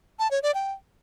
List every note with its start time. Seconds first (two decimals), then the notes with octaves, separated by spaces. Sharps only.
0.19 A5
0.31 C#5
0.43 D5
0.54 G5